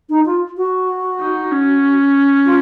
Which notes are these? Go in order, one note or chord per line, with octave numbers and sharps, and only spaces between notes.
D#4
F4
F#4
D#4
C#4
F4